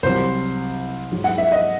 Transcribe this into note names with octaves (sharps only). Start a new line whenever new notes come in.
C2 C3 F#3 C5
G#2 F#3
F#5
E5
D#5